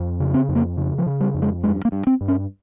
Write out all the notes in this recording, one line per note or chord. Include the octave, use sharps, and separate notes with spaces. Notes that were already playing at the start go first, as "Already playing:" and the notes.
Already playing: F2
C#3
C4
F2
A#3
C#3
F3
C#3
G3
F2
G#3
G2 G#3
A#3
G2
C4
G2
C#4